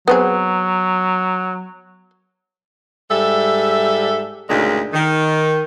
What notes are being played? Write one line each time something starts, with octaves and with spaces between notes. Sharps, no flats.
F#3 B3 C4 G#4
G#2 G3 A4 E5
D2 A#2 C#3 G#3 D#4
D#3